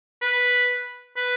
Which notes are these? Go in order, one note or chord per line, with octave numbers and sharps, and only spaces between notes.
B4
B4